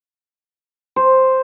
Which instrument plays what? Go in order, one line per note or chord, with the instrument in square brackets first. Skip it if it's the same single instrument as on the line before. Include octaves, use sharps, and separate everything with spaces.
[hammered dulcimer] C5